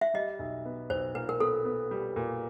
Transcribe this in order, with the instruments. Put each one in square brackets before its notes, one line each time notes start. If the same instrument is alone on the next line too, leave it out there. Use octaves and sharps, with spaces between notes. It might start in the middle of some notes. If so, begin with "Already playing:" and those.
[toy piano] E5
[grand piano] G3 [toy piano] D#5
[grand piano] B1
B3
[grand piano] B1 [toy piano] C5
[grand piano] A#2 [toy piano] B4
[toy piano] A#4
[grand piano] B3 [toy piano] A4
[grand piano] B3
G3
A#2